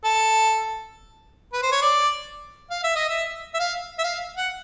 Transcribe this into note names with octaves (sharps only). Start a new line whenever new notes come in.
A4
B4
C5
C#5
D5
F5
E5
D#5
E5
E5
F5
E5
F5
F#5